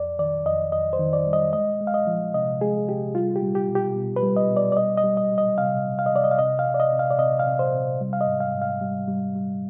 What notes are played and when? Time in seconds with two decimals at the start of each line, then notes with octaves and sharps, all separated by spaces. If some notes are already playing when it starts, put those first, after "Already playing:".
Already playing: F2 D5
0.19 D#3 D5
0.45 F2 D#5
0.72 F2 D#5
0.93 C5
0.99 D#3
1.13 D5
1.27 G3
1.33 D#5
1.53 G#3 D#5
1.81 G#3
1.87 F5
1.94 D#5
2.07 F3
2.34 C3 D#5
2.61 G#3 G#4
2.88 C3 G4
3.15 G3 F4
3.36 G4
3.43 G3
3.55 G4
3.69 B2
3.75 G4
3.96 B2
4.16 B4
4.23 G3
4.37 D#5
4.50 B2
4.57 D5
4.72 D5
4.77 G3 D#5
4.98 D#5
5.04 G3
5.17 D#5
5.31 G3
5.38 D#5
5.58 C3 F5
5.85 C3
5.99 F5
6.06 D#5
6.11 C3 D5
6.24 D#5
6.31 F5
6.39 C3 D#5
6.59 F5
6.66 C3
6.74 D5
6.80 D#5
6.92 C3
6.99 F5
7.11 D5
7.19 C3 D#5
7.39 F5
7.47 C3
7.59 C5
7.74 C3
8.01 G3
8.13 F5
8.21 D#5
8.27 G#2
8.40 F5
8.54 G#2
8.62 F5
8.81 G3
9.08 G3
9.35 G3